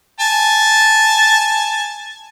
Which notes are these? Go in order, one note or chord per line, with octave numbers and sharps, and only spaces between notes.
G#5 A5